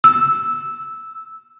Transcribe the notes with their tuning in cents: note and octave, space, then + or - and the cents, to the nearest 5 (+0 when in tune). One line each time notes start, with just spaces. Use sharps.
E6 -10